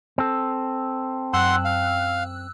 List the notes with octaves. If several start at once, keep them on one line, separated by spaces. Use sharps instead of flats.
C4 A4
F#2 F#5 C6 E6 F#6
F5